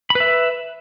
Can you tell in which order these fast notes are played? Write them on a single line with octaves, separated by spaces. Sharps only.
B5 B4 E5